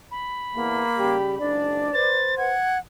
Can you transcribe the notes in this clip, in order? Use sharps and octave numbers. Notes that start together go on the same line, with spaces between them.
B5
E2 A#3
C#3 G3 G4
F#1 G#2 D4 D5
B4 C5 A6
F#5 G#6